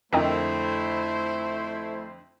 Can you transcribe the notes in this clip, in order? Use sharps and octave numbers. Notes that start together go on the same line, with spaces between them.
F2 D3 A3 E4 A#4 C5 D#5 G5